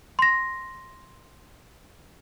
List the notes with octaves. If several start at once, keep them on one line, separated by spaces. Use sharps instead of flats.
C6 A#6